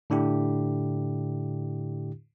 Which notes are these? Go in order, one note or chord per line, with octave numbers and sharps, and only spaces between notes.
A2 D3 D4 E4 G4